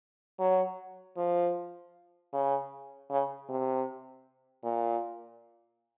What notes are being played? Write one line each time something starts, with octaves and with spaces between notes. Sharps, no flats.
F#3
F3
C#3
C#3
C3
A#2